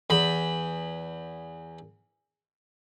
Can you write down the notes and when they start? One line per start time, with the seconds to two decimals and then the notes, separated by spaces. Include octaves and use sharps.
0.10 E2 B5